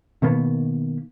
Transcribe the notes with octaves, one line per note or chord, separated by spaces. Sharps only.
B2 D#3 A#3 B3